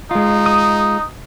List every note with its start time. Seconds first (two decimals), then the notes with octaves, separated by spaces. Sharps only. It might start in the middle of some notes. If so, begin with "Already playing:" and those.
0.11 G#3 D#4 F4
0.46 D#6